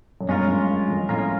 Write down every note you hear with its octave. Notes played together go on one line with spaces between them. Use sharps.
F#2
G2 G#3 C#4 F4 A#4
F#2
G2
F2
A2 G#3 C#4 F4 A#4